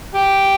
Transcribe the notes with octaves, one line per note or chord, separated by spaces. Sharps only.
G4